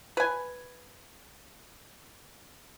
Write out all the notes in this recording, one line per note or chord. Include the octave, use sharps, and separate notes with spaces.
B4 G#5